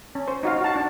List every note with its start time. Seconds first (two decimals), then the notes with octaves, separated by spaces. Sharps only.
0.15 C#4
0.28 C5
0.43 D#4 F#4 F5
0.61 F#4 A5
0.76 D4